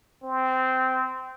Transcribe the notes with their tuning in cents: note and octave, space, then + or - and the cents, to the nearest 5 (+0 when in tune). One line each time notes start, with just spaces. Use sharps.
C4 -15